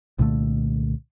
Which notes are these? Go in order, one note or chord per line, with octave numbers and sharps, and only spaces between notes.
C2 A#2 D3 A3